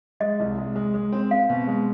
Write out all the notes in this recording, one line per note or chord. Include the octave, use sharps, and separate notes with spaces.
G#3 D#5
C2
G#3
G#3
G#3
C4
C4 F5
B2
G#3